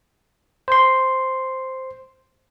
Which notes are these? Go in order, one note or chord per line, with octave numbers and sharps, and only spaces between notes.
C5 C6